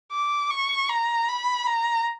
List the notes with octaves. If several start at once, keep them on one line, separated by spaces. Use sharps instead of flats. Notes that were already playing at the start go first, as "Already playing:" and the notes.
D6
C#6
A#5
B5
A#5